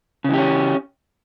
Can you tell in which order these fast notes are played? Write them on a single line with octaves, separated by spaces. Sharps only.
C#3 E3 G4 C#4